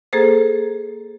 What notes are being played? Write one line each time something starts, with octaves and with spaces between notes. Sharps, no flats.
A#3 G#4 A4 C5